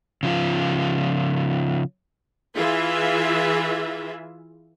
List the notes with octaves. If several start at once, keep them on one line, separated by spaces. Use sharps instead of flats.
C#3 F3 F4
E3 F4 G#4 E5